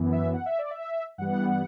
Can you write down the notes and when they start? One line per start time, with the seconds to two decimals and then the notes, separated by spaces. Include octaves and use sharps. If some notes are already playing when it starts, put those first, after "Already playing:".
Already playing: F#2 E3 B3
0.12 E5
0.34 F#5
0.46 E5
0.59 D5
0.71 E5
1.18 G2 E3 G3 B3 F#5